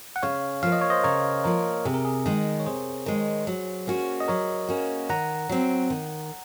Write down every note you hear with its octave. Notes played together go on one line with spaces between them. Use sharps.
F#5
C#3 C#5 F5
F3 A#3 F5
D#5
C#5
C5 D#5
C#3 A#4 C#5
F3 A#3 A#4
C3 G#4
A#4
G#4
D#3 G#3
C#5
C3 G#4 C5
D#3 G#3
F#3
A#3 C#4 F#4
D#5
F#3 A#4 C#5
A#3 C#4 F#4
D#3 F#5 A#5
F#3 C4
D#3